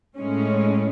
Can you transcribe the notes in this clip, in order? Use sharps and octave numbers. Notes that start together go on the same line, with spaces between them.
A2 G#3 C#4